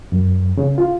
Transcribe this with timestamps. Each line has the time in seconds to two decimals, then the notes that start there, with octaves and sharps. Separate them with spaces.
0.12 F#2
0.57 C#3
0.78 F4